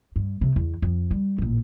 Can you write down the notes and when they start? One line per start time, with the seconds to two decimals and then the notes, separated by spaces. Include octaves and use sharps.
0.16 G2
0.41 C3
0.56 E2
0.82 F2
1.11 G3
1.38 A1 A#2